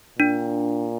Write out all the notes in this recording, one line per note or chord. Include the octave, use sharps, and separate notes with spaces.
A#2 D4